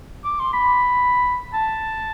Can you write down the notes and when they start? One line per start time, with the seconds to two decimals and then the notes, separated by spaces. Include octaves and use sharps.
0.24 D6
0.40 C6
0.53 B5
1.54 A5